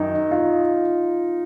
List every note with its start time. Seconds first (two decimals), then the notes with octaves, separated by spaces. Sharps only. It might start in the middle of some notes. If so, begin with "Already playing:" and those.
Already playing: F#2 D#3 D#4
0.31 F4